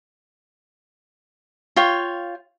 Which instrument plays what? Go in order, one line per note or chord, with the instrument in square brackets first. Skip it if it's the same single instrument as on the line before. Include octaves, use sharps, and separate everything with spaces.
[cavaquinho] F4 C#5 G5